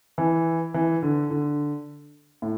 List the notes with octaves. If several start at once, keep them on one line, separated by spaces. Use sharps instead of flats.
E3
E3
D3
D3
A2